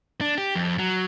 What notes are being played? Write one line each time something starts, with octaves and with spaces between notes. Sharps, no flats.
D4
G4
F2
F#3